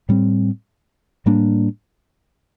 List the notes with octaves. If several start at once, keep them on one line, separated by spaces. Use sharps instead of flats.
A2 G3 C4
A2 G3 A#3 D4